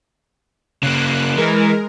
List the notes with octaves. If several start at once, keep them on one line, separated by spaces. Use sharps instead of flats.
C#3 A#3 F#6
E3 G#3 A#4